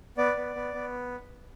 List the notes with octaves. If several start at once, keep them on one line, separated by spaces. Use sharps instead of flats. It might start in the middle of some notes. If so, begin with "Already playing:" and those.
B3 D5
B3
B3
B3